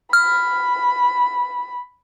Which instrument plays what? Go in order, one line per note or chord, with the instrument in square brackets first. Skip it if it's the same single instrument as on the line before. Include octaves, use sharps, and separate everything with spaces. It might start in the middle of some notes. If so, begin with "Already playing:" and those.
[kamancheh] B5 [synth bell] F6